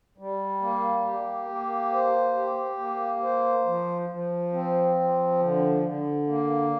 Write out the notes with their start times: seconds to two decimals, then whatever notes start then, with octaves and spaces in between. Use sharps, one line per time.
0.18 G3
0.62 A#3
1.05 G4
1.49 A#3
1.92 C5
2.35 G4
2.79 A#3
3.22 C5
3.65 F3
4.10 F3
4.53 C4
4.96 F3
5.39 D3
5.83 D3
6.27 A#3